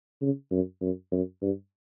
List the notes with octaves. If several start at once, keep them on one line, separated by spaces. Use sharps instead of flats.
C#3
F#2
F#2
F#2
G2